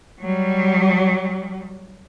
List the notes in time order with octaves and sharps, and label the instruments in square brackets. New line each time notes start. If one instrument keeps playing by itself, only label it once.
[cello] F#3 G3